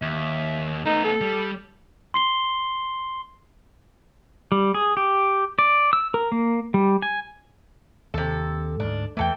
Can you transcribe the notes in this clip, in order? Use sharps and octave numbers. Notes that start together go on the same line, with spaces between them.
D#2 E5
A3 B3 D#4
A4
G3
C6 C7 G7
G3
G#4
G4
D5
E6
A#4
A#3
G3
G#5
D#2 C3 A4
D2 G#2 D4
E2 E3 A3 A4 G5